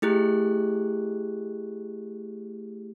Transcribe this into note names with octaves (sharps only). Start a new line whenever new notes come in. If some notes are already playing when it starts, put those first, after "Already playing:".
A3 E4 G4 G#4 F#6